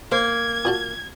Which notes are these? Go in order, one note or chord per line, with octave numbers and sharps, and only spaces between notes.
A#3 C5 G#6
A#2 F#4 A5